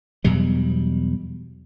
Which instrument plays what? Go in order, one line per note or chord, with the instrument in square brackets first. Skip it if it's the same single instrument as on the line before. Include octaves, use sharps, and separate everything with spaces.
[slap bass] E2 B2 F#3 G3